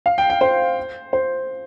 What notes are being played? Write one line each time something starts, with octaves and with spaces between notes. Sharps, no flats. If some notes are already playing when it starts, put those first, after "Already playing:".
F5
G5
G5
C5
C5